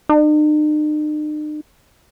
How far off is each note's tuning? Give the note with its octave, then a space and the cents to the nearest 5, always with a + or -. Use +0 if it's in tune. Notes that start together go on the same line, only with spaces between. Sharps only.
D#4 -45